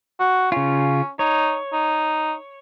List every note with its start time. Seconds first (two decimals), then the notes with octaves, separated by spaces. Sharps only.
0.20 F#4
0.52 C#3 C#4 F4
1.19 D#4 C#5
1.73 D#4